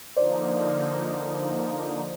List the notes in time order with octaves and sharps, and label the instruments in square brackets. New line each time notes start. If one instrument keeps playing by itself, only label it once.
[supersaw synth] D3 F3 A#3 D#4 [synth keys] C5 D5